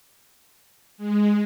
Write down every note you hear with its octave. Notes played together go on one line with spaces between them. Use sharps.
G#3